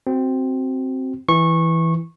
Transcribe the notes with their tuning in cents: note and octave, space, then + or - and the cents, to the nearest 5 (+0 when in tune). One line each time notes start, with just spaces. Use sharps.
C4 +0 F#4 +15
E3 +0 C#6 -20